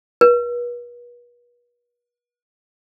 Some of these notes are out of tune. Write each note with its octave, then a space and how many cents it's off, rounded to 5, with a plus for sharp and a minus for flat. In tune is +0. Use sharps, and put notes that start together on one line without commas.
B4 -40